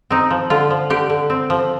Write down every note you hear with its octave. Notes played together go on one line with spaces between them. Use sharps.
C4 D#4
F3
D3 F4
F3
D3 G4
D3
C4
F3